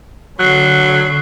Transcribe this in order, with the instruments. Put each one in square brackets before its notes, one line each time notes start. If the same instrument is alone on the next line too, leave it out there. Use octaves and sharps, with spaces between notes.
[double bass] D3 [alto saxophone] F#3 [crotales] F#6 C7